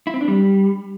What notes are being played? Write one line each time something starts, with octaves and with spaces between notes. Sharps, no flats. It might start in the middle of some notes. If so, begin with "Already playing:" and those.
E4
C4
D4
G3